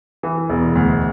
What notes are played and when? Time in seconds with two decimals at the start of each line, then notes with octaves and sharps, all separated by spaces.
0.23 E3
0.49 E1
0.75 D2